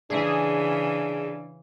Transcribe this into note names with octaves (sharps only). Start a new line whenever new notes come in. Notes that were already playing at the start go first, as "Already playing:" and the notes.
C#3 E3 D4 G#4